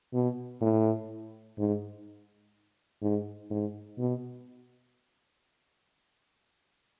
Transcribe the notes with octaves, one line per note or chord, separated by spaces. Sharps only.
B2
A2
G#2
G#2
G#2
B2